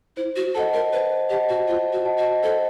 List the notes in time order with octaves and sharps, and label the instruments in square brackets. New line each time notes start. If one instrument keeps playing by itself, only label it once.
[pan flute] E4 [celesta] C5
[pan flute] F#4
[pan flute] A4 [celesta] D#5 F#5 A5
[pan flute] A#4
[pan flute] B4 [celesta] C5
[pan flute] G4 [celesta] D#5 F#5 A5
[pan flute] F#4
[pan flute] F4 [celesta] C5
[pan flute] F#4
[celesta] D#5 F#5 A5
[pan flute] F#4
[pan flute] A4 [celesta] C5